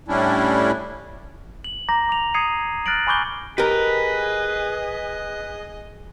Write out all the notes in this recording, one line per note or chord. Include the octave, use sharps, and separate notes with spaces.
A2 G3 C#4 D4 E4
F#7
A#5 D6 G6 A#6
D6 F7
A#5 D#6 G#6 C7 C#7 D#7
F6 F#6 A6 A#6 D7 F#7
G#5 B5 C#6 D6 G6 G7
G4 G#4 A#4 B4 D#5